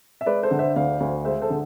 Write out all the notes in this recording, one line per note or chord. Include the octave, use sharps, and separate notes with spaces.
E5
G#3 B4 D5
A4 C5
D3
C5 E5
D2 D5 F5
D2
G#3 C5 E5
A4 C5
D3